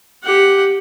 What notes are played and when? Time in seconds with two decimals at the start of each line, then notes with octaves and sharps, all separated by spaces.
0.24 G4 F#5